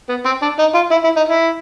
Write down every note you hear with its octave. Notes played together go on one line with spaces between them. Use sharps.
B3
C4
D4
D#4
F4
E4
E4
D#4
E4